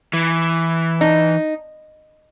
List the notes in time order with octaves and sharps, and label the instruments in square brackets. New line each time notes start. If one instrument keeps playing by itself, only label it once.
[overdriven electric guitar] E3
[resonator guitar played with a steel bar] D#4